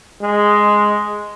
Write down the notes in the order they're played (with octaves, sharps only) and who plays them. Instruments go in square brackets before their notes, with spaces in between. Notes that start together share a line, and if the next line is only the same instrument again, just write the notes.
[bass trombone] G#3